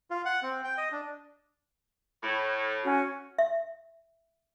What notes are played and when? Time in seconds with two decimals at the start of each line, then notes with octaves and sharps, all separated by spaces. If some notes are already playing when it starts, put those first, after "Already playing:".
0.11 F4
0.25 F#5
0.43 C4
0.64 G5
0.77 D#5
0.92 D4
2.23 A2
2.83 C#4 F#4
3.38 E5